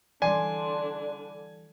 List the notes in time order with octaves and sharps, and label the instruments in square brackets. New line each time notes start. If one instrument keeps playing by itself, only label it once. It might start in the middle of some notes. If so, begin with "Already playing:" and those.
[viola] D3 D4 [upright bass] E3 G3 [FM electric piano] D5 C6 [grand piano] G#5